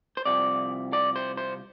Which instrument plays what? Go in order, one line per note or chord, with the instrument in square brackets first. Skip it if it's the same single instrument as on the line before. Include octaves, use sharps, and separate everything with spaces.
[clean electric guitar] C5
C2 C3 F3 D5
D5
C5
C5